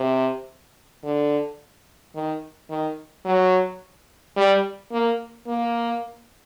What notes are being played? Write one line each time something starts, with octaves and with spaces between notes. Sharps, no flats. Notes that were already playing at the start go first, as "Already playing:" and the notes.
Already playing: C3
D3
D#3
D#3
F#3
G3
A#3
A#3